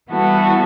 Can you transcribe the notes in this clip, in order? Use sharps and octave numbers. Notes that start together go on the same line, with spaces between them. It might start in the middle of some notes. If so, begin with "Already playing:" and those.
E3 G3 B3 F#4 A4